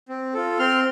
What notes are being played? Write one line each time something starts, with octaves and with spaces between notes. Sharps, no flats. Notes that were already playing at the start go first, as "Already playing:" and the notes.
C4
F4 A4
C4 C6 F6